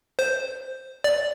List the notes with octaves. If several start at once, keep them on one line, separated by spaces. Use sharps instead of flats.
C5
D5